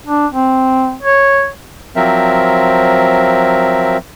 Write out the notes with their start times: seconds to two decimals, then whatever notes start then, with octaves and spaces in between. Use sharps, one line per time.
0.06 D4
0.32 C4
1.03 C#5
1.96 F3 F#3 C4 A#4 E5